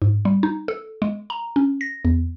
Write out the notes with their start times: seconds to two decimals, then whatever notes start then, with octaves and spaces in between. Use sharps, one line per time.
0.02 G#2
0.25 G3
0.43 D#4
0.68 A4
1.02 G#3
1.30 A#5
1.56 C#4
1.81 A#6
2.05 E2